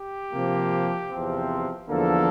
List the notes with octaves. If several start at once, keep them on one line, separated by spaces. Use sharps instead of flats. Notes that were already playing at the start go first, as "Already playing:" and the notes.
Already playing: G4
C3 F3 A#3
E2 C3 F3 C4
E2 D3 F3 A#3 A4